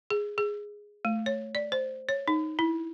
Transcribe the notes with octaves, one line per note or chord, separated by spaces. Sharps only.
G#4
G#4
A3
C#5
D5
C5
C#5
D#4
E4